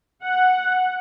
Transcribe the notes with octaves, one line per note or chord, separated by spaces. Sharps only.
F#5